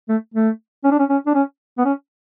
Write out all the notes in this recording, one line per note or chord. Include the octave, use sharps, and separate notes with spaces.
A3
A3
C#4
D4
C#4
C#4
D4
C#4
B3
C#4